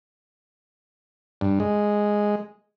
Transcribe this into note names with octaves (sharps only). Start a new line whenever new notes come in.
G2
G#3